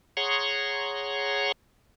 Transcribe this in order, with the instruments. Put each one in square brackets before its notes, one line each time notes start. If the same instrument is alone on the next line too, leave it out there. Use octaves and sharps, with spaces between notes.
[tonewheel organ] G#4 C#5 F#5 A#5 C6 C#6